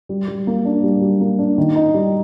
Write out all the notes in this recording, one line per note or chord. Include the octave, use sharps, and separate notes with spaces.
G3
G3
A#3
D4
G3
G3
A#3
D4
D#3
D#4
G3